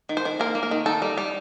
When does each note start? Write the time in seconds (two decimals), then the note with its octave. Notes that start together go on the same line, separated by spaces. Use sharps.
0.09 D#3
0.17 C5
0.25 D#3
0.39 A#3 A#4
0.55 A#3
0.63 A#4
0.71 D#3
0.86 D#4 A4
1.02 G3
1.18 G3